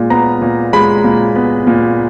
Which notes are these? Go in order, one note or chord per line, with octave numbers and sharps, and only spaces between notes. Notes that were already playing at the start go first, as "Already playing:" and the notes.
Already playing: A#2 G#3
B3 A#5
A#2
G#3 B5
A#2
B3
A#2